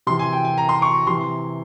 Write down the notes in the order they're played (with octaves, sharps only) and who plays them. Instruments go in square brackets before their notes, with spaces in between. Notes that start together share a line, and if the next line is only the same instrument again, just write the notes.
[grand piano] C3 E3 C6
G#5
G5
G#5
A#5
C6
C#6
C3 E3 C6